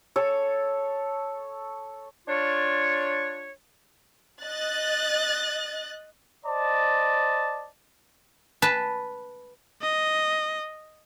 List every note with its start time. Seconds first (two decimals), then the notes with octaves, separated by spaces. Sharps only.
0.16 A4 C#5
2.28 D4 F4 C#5
4.43 D#5 F#6 A6
6.44 C5 D5 D#5 A5
8.62 B4 A5
9.82 D#5